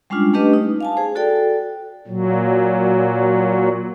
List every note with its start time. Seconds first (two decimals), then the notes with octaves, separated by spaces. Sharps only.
0.10 G3 G#3 C#4 D4 F4
0.33 A3 C#4 D4 G4 B4 D#5
0.53 D#4
0.81 F5 G#5 A5
0.97 G#4 C5
1.15 F#4 A4 D5 G5
2.07 A#2 F#3